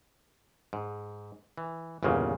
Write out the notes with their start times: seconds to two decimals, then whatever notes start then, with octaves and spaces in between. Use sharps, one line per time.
0.73 G#2
1.58 E3
2.03 G1 E2 A#2 C#3 A#3